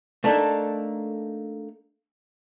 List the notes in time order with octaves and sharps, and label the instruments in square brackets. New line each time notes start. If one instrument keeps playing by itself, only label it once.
[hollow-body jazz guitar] A3 A#3 D4 D#4 A4